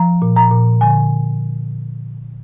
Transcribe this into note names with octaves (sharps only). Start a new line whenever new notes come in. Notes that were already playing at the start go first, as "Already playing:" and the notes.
Already playing: F3 A#5
A#2
A#5
A#2
D3 G#5